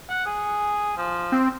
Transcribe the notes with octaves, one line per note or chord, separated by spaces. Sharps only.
F#5
G#4
F3
C4